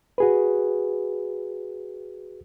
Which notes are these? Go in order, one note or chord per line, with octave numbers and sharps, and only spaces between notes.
F#4 G#4 B4